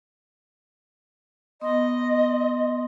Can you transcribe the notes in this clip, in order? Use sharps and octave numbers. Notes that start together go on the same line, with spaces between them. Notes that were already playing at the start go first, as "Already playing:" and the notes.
B3 D#5 C6 D#6